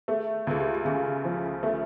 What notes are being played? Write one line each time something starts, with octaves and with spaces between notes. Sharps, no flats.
A3 G#4
C#2 G#4
G4
G4
C#3 G#4
F3
A3